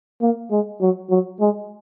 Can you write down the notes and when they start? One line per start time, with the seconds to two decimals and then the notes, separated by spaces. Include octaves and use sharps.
0.22 A#3
0.51 G#3
0.81 F#3
1.10 F#3
1.40 G#3